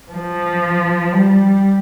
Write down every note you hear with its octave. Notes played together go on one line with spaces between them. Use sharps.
F3
G3